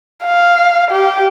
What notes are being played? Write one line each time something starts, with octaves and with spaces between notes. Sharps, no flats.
F5
G4